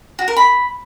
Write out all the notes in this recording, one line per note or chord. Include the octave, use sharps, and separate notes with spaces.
F#4
A#4
B5